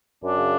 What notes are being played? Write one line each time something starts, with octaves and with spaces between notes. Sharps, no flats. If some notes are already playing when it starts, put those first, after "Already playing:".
F#2 D4
C#3